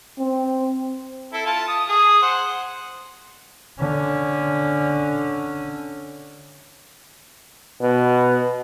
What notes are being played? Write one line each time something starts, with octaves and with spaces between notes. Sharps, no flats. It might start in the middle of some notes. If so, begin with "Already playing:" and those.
C4
E4 A4
F4 A5
D#6
G#4 D#6
C5 F#5
D3 C#4
B2